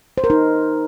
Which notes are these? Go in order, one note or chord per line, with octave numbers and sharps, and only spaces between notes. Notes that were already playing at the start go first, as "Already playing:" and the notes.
C5
A#4
D#4